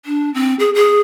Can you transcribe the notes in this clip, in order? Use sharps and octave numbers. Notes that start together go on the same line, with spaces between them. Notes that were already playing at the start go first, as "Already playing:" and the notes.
D4
C4
G#4
G#4